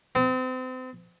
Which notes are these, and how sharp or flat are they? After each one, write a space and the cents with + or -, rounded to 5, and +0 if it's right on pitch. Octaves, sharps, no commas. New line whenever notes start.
C4 -35